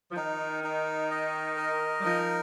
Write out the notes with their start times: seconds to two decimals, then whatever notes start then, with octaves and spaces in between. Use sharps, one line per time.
0.11 F3
0.16 D#3 D#4
0.64 D#4
1.11 D#5
1.57 A#4
1.99 G3
2.05 F3 D#4